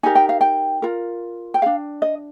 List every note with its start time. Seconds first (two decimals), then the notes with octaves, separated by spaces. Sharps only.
0.03 D#4 G4 A#4 G#5
0.15 G5
0.29 F5
0.41 G5
0.82 F4 A#4
1.54 G5
1.62 G#4 F5
1.66 D4
2.02 D#5